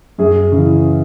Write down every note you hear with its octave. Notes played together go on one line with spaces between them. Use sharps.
F#2 G#4
C#3 E3